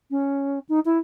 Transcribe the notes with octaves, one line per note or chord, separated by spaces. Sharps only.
C#4
D#4
E4